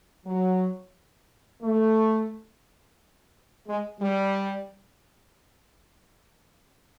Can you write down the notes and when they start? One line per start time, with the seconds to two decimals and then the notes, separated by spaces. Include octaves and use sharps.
0.26 F#3
1.63 A3
3.67 G#3
4.01 G3